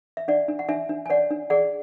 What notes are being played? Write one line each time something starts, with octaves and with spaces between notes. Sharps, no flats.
E5
D4 D5 F#5
D4
F#5
D4 E5 G#5
D4
G#5
C#5 D5 F#5
D4
G#4 D5 F#5